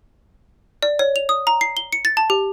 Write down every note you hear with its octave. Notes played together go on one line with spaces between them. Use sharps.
D5
C#5
F7
D#6
A#5
C7
G7
C#7
A6
A5
G4